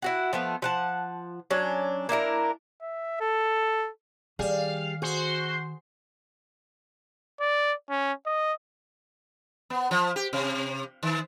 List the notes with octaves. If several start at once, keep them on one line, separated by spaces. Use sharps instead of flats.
E4 F#4 F#5
F3 A3 B3
F3 F#5 A5
F#3 C#4 D4
A#3 D4 E4 A#4
E5
A4
D#3 G3 G#4 F5
F#4 G#4 C5 C6
D5
C#4
D#5
B3
F3
G4
C3
D#3